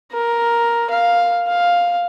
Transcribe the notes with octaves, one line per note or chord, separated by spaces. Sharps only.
A#4
F5
F5